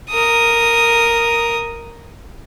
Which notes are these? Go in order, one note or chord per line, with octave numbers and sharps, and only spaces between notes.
A#4 D#6